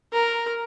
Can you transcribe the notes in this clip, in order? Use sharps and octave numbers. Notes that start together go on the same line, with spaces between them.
A#4